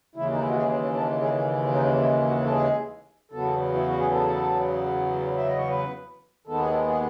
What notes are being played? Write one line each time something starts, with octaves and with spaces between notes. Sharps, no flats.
D#2 C#3 E3 G#3 E4
D#4
E4
F#4
G#4
A4
G#4
D#4
E4
F#4
A4
G#4
E2 C#3 F#3 B3 A4
E4
F#4
G#4
A4
E5
D#5
C#5
B4
D#2 D#3 G#3 B3 A4
G#4
A4
G#4